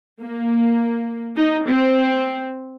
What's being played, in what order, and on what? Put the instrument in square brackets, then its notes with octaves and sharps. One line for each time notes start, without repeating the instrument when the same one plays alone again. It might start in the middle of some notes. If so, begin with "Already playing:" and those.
[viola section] A#3
D#4
C4